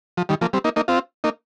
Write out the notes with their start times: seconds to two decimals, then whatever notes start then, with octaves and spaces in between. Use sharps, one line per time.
0.17 F3
0.29 D#3 G3
0.41 F3 A#3
0.53 G3 C4
0.64 A#3 D#4
0.76 A#3 D#4
0.88 C4 F4
1.24 A#3 D#4